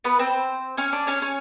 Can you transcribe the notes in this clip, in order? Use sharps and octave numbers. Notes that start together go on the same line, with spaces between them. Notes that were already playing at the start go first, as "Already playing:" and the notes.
B3 B4
C4 C5
C#4 C#5
D4 D5
C#4 C#5
C#4 C#5